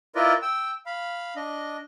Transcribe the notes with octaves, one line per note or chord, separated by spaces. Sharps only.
E4 F4 A#4 B4 D5 D#5
G5 E6
F5 B5
D4 D#5